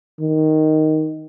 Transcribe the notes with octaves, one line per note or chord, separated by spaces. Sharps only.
D#3